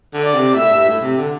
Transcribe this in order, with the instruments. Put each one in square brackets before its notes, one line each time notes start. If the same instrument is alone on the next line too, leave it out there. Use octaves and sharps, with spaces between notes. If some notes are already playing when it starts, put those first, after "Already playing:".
[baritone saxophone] D3
[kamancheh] D5
[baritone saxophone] C3
[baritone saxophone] A2 [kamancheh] E5
[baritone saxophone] G2
A2
C3
D3